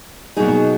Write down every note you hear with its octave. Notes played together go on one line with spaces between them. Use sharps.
B2 F#3 A#3 D#4 G#4